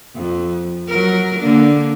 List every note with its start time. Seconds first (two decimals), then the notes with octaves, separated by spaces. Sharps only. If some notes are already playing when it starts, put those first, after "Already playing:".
0.16 F2
0.89 F#3 A#4
1.39 D3 A#3 D4